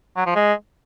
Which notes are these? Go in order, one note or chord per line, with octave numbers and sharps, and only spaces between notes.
F#3
F3
G#3